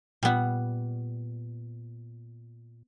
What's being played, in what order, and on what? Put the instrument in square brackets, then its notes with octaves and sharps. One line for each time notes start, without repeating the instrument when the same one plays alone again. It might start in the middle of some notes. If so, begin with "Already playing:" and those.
[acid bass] A#2 [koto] G3 B3